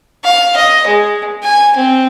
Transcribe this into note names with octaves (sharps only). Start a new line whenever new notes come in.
F5
D#5
G#3
G#5
C4